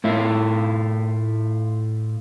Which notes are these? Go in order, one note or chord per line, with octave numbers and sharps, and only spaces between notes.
A2 A3 E4 F4